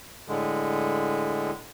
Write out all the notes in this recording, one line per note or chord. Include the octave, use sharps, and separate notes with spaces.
A2 D3 G#3